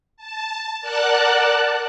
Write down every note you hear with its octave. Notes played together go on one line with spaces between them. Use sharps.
A5
A#4 D5 F#5 A5 F#6